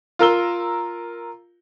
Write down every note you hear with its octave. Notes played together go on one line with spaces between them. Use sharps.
F4 A#4 E6 G7